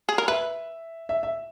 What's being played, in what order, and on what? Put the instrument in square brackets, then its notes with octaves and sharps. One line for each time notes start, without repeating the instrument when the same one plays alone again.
[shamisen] G#4
A#4
[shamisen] B4 [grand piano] E5
[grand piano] E5
E5